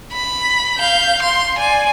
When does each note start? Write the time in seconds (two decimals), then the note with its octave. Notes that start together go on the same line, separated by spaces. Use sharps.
0.12 B5
0.78 F5 G6
1.22 C6
1.57 D5 G#5